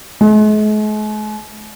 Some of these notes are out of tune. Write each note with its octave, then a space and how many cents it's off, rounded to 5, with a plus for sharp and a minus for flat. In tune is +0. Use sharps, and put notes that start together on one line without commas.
G#3 +45